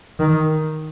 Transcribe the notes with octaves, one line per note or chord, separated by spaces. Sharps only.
D#3